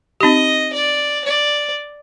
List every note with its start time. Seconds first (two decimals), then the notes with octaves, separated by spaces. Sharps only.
0.21 C4 D#4 G4 D#5
0.73 D5
1.24 D5